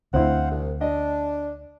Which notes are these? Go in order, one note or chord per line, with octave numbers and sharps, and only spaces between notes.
D2 D3 C4 E4 C5 F5 F#5
C2
D4 D#5